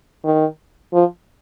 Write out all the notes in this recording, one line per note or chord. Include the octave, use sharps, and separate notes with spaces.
D#3
F3